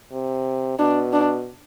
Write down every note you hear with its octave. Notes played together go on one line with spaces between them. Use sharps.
C3
B2 D4
D4